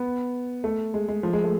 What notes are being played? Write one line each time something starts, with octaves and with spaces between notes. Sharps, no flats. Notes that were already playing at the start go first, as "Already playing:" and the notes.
Already playing: B3
A3
G#3
G#3
F3
G#3
A3